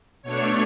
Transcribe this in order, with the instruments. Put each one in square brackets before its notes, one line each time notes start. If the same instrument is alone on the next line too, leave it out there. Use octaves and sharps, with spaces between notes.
[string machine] B2 A3 D4 C#5